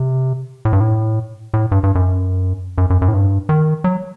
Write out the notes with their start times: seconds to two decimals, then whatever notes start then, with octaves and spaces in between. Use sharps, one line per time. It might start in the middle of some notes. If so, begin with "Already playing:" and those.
Already playing: C3
0.65 A2
0.73 G2
0.81 A2
1.54 A2
1.72 G2
1.83 G2
1.95 F#2
2.78 F#2
2.90 F#2
3.02 F#2
3.08 A2
3.14 G2
3.49 D#3
3.84 F#3